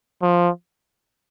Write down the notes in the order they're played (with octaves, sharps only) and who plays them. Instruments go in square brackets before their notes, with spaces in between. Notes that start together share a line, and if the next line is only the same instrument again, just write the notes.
[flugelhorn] F3